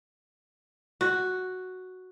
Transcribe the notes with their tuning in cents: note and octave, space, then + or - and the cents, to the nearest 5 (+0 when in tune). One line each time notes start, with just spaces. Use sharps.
F#4 +0